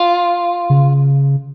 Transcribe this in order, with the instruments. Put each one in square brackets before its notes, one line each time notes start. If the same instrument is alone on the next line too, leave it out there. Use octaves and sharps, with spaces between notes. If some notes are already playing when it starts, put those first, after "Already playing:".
Already playing: [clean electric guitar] F4
[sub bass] C#3